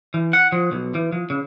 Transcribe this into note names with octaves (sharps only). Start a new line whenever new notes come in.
E3
F#5
F3
B1
E3
F3
C#3